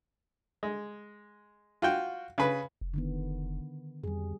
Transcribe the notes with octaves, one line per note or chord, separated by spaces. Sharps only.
G#3
F4 F#4 G5
C#3 B4
F1
D3 D#3 B3
F2 G3 G#4